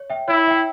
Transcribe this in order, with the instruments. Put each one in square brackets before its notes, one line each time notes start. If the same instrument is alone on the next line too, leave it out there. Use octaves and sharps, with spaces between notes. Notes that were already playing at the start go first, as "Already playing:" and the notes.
Already playing: [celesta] C#5
E5 G5
[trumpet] E4 [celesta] C#5
[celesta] E5 G5